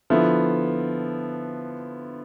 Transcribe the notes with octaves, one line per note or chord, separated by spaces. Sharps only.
D3 F3 B3 E4